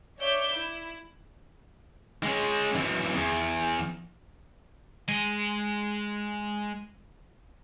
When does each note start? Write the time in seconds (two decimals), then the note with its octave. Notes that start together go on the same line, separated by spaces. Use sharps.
0.19 C#5 D5 E5 D6 G6
0.54 E4
2.23 G#3 C#4
2.75 F#2 E3
3.14 E2
5.09 G#3 G#5